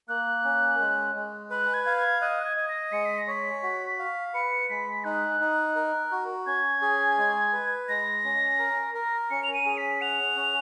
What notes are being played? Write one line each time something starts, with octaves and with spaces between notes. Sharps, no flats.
A#3 F#6
C#4
G#3
G#3
B4 F#6
G#6
F5
G#6
D#5 F#6
F#6
G#6
D#5
A#6
G#3 C#7
B6
A#6
C#5 B6
F#4
F5
B4 C#7
G#3 B6
D#4 F#6
D#4
A#4
F#4
C#4 G#6
G#4
G#3
B4
G#3 A#6
C#4
A#4
A#4
C#4 C#7
F7
D#7
G#4
B6
F#5 F7
C#4